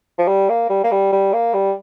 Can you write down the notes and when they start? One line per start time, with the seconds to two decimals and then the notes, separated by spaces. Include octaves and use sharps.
0.19 F3
0.28 G3
0.50 A#3
0.70 G3
0.84 A#3
0.92 G3
1.13 G3
1.33 A#3
1.54 G3